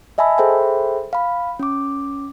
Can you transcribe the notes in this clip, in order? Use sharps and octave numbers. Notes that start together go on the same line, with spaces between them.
D#5 E5 G#5 A5 B5 E6
G#4 A4 C5 E5 G5 B5
F5 B5
C#4 D6